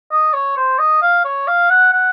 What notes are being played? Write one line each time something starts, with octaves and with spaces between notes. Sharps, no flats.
D#5
C#5
C5
D#5
F5
C#5
F5
F#5
F#5